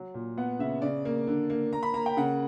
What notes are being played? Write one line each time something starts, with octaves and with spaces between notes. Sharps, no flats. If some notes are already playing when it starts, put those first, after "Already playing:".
Already playing: F#3
A#2
B3 F#5
C#3 E5
C#3 D5
A#3
D3
A#3
A#3 A#5
B5
A#3 A#5
G5
C#3 F#5